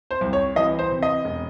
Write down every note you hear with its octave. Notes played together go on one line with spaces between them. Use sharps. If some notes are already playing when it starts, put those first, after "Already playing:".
C5
C2
C#5
E3 D#5
C5
C3
D#5
E1